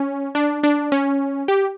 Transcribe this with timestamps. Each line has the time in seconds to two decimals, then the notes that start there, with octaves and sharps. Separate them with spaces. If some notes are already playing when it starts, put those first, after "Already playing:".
Already playing: C#4
0.35 D4
0.63 D4
0.92 C#4
1.48 G4